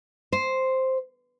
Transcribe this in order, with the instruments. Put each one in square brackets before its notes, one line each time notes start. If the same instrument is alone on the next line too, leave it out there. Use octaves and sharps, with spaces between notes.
[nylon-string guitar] C5